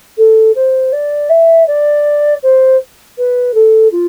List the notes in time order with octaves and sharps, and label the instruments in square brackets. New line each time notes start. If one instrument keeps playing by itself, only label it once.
[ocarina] A4
C5
D5
E5
D5
C5
B4
A4
F4